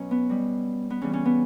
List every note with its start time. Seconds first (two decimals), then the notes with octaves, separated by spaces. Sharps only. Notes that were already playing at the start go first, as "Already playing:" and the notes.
Already playing: B2 F#3 C#4
0.11 B3
0.29 B2 G3
0.90 B3
1.02 C#3 E3 G3 C#4
1.13 C#4
1.25 B3